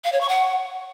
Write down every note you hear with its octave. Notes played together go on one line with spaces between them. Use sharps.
F5
C#5
C#6
F#5